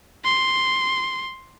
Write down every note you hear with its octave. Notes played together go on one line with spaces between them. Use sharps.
C6